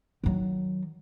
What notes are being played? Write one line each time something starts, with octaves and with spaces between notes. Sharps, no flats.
D#3 F#3